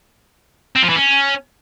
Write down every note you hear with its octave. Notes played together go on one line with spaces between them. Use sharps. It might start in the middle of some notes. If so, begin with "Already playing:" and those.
C4
F3
E3
C#4